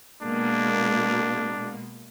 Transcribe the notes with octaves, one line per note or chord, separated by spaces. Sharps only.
B2 G#3 A#3 D4